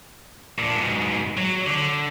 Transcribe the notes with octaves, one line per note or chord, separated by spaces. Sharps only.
A#2 D4
G#2 B2
F#3
D3